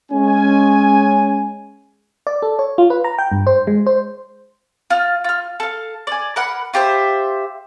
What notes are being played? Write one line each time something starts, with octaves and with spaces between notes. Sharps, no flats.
G#3 C#4 G#5
D5
A4
C#5
F4
B4
A#5
G5
G2
C5
G#3
C5
F4 F6
F4 F6
A4 F5
D5 G#5
A#4 B4 F#5
F4 G4 C5 E5